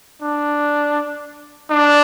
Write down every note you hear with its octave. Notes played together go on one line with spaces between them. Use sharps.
D4
D4